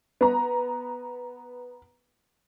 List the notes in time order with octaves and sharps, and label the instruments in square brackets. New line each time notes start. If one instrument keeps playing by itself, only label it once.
[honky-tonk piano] B3 A#5